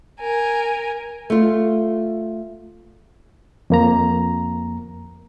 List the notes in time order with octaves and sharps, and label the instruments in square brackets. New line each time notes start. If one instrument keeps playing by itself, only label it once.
[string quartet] A#4 G#5
[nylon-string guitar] A3 F4
[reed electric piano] F2 A#3 A#5